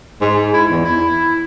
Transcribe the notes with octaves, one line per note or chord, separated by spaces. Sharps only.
G#2
E4
E2
E4